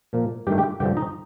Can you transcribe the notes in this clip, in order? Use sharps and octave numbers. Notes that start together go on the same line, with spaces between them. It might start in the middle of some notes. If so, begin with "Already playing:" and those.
A#2 F3 A#3
G2 D#3 A3 G4 G5
G4 G5
G2 D3 F3 G4 G5
D#4 D#5